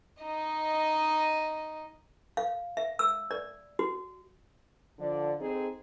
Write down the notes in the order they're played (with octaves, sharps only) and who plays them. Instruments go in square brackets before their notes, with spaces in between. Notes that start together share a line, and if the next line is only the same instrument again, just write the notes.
[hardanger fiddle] D#4 D#5
[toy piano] F5
E5
E6
D5
F#4
[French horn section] D3 F3 D5
C4 D#4 G#4 A4 C5